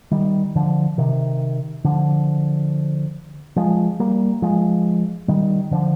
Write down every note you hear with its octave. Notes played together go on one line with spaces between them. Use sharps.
D#3 G3
D3 F3
C3 D#3
D3 F3
F3 G#3
G3 A#3
F3 G#3
D#3 G3
D3 F3